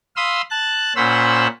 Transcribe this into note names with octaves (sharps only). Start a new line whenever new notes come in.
F5 B5 C6 D#6 E6
A5 F#6
A#2 C#4 C5 F#5 B5 E6